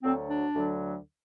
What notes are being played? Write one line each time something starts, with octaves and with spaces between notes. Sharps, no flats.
D2 D3 F#3 C4
D4
D2 D3 F#3